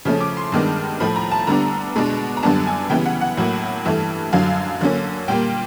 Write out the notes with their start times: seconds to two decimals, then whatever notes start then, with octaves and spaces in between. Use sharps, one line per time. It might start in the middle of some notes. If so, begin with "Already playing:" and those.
0.05 C#3 F3 A3 C#4
0.21 D6
0.37 C6
0.52 G2 D#3 G#3 B3 D4
1.00 A2 F3 A3 B5
1.16 A#5
1.31 A5
1.47 D3 G3 B3 D4 A#5
1.96 B2 G#3 B3 D4
2.37 A#5
2.43 F#2 D3 G3 B3 D4 A5
2.67 G#5
2.89 C#3 E3 G3 B3 G5
3.05 F#5
3.21 F#5
3.37 A2 F#3 A#3
3.85 G2 E3 A3
4.33 F#2 D3 F#3 F5
4.81 D3 F#3 A#3 C#4
5.28 A#2 G3 A#3 G5